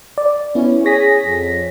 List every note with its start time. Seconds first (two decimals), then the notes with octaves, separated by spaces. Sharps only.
0.18 D5
0.55 B3 C#4 E4
0.85 G#4 C#5 A#6 B6
1.26 F2